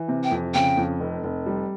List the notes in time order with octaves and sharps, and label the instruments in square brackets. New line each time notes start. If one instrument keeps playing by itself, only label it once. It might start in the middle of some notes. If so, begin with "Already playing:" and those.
Already playing: [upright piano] E3
C3
[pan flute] G5
[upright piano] F2
[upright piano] C#3 [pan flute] G5
[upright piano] F2
F1
F1
G3